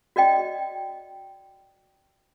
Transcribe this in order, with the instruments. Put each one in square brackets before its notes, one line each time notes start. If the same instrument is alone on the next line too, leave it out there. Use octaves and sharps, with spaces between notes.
[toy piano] F#4 D5 D#5 G5